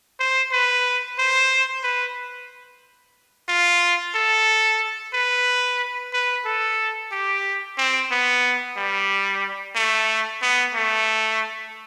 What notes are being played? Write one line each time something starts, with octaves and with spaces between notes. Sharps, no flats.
C5
B4
C5
B4
F4
A4
B4
B4
A4
G4
C4
B3
G3
A3
B3
A3